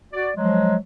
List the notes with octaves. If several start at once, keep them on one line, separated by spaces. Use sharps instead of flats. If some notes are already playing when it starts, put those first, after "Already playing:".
F#4 D5
F3 F#3 G#3